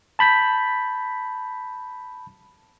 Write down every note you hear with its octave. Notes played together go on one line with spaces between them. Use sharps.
A5 B5 G6 B6